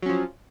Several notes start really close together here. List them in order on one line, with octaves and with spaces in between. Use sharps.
F#3 C#4 F3